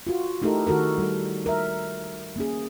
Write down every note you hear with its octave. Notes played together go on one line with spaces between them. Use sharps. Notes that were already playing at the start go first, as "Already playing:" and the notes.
F4 F#4
A3 D#4 E4 G4 A4 A#4
D#3 F#4 A4 A#4
G3 A4
A#4 E5
A#3 C#4 G#4